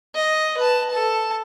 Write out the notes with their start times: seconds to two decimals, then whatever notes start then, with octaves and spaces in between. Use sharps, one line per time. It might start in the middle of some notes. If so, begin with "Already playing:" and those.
0.15 D#5
0.58 B4 A5
0.90 A4 A5